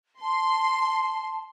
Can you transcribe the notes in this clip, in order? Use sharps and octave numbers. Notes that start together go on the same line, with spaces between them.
A5 C6